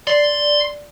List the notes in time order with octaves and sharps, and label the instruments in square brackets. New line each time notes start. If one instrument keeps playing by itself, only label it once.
[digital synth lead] D5 [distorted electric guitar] C6